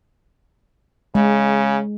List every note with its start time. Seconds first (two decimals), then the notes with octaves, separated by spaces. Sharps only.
1.15 C#3 G#3